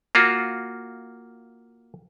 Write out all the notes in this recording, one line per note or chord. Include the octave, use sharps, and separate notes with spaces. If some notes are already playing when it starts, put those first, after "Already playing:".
A#3 F4 F#4